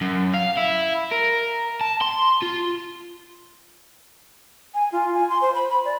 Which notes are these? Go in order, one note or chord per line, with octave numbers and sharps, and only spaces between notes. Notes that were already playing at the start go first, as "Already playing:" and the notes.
F#2
F5
E4
A#4
A5
C6
F4
G#5
F4
G#5
C6
C5
B5
B5
D5